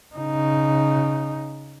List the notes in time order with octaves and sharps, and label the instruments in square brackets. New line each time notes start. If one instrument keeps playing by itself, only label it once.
[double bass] C#3 D#4